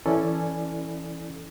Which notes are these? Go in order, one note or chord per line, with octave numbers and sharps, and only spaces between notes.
E3 C#4 E4 A4 D5 G#5